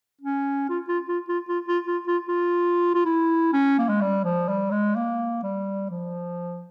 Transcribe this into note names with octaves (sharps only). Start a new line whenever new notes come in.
C#4
F4
F4
F4
F4
F4
F4
F4
F4
F4
F4
E4
C#4
A#3
G#3
G3
F3
G3
G#3
A#3
G3
F3